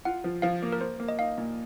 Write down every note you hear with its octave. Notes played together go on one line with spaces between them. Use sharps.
F4 F#5
F3
F3 F5
A#3
A#4
A#3 C5
A#3
D#5
D#4 F5
A#2